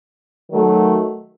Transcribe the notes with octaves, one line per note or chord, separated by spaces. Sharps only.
D#3 F#3 A3